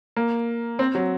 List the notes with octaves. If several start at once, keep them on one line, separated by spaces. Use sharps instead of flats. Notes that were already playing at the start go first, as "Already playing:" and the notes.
A#3
C4
F#3